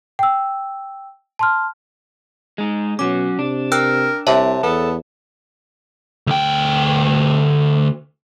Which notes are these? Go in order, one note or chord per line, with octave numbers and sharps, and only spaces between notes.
G5 E6
A5 C6 F6
G#3 D#4
B2 F#3 C#4 D6
C3 D4
A#4 G5 E6 F#6
C2 C3 C#5 E5 A5
E2 B3 A4
D2 G5